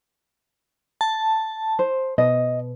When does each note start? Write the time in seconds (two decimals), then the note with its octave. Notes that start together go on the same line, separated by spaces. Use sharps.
1.01 A5
1.79 C5
2.18 B2 D#5